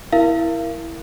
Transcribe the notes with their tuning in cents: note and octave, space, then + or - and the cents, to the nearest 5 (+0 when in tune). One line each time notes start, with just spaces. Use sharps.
E4 +0 A#4 +5 F5 -45